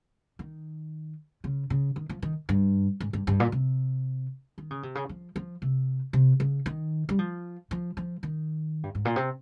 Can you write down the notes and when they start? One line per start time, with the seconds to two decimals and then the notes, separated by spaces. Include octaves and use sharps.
0.39 D#3
1.44 C#3
1.70 C#3
1.96 D#3
2.09 F3
2.22 D#3
2.49 G2
3.00 G#2
3.13 G2
3.27 G2
3.40 A#2
3.52 C3
4.58 D#3
4.71 C#3
4.83 C3
4.95 C#3
5.09 F3
5.36 F3
5.62 C3
6.13 C3
6.40 C#3
6.66 D#3
7.09 G3
7.19 F3
7.71 F3
7.97 F3
8.23 D#3
8.83 G2
8.95 G#2
9.05 A#2
9.16 C3